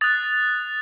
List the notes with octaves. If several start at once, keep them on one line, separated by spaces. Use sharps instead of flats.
D#6 F#6 A6